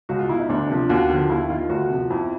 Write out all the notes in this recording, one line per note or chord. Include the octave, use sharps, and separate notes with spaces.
C#2 F#4
F4
B2 E4
D#4
D2 D4
C3 F3
D#2 F#4
D3 F3
D#2 E4
D#3 F4
D2 F#4
C3 F3
F2 E4